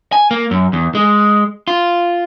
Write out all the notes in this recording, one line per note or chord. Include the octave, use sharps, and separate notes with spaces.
G#5
A#3
F#2
E2
G#3
F4